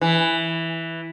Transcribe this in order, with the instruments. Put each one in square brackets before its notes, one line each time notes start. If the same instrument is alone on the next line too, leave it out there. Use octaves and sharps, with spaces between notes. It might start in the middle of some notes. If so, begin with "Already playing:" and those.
[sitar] E3